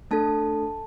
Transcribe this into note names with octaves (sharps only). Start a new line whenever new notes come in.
A3 D4 A4 A5